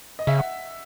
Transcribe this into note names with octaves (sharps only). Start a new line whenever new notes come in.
D#5
C#3 E5
F#5